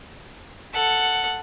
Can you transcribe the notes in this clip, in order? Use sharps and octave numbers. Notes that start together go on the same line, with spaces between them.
A4 F#5